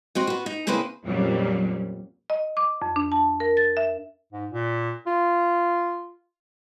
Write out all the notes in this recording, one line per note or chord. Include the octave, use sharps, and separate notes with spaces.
C4 F#4 D#5
B3 F#4
D#4
C#3 A#3 C4 E4 G#4 B4
F2 A#2 F#3 G3 C#4
D#5
D6
F2
D4
A5
A#4
A6
E5
G#2
A#2
F4